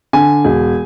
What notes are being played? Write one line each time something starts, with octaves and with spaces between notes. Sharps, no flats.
D3 G#5
E1